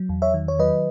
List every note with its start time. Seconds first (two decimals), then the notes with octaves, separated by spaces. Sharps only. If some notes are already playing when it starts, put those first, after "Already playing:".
Already playing: F#3
0.09 E2
0.22 C#5 E5
0.34 D#3
0.48 C#5
0.59 F#3 B4 D#5